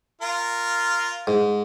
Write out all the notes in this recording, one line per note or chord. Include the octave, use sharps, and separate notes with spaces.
F4 A#4
G#2